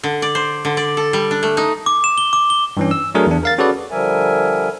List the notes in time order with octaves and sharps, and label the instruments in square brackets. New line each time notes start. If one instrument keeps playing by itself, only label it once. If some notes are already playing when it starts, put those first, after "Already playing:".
[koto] D3
D5
C5
D3
D5
A4
G3
D4
A3
D#4
[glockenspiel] D6
E7
G7
D6
G7
[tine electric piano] G2 E3 C#4
E6
F#3 A3 D4 G#4 A#4
E2 D4
A#4 F5 A6
C#4 F#4 G#4 A4 B4 D5
[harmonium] D3 F3 G3 A#4 E5 G#5